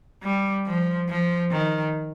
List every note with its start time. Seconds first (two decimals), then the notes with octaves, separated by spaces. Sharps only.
0.23 G3
0.67 F3
1.09 F3
1.52 D#3